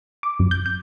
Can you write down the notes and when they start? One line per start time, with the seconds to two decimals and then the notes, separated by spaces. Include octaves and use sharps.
0.23 D6
0.39 F#2
0.51 G6
0.66 G6